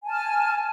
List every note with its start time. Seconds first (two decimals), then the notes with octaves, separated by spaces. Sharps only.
0.02 G#5
0.06 A5
0.11 F6